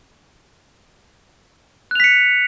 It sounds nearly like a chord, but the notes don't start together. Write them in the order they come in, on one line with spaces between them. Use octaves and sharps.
F#6 F7 B6 C#7